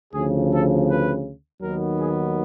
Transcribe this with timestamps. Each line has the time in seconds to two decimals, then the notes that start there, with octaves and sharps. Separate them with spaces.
0.14 D2 C#3 F3 G#4
0.51 A4
0.88 B4
1.61 D#2 D#3 F#3 B3 A#4
1.98 G#4